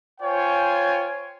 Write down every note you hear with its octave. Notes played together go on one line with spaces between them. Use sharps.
F4 C5 C#5 G5 G#5